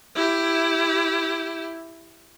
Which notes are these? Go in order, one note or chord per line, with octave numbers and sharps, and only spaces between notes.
E4 G4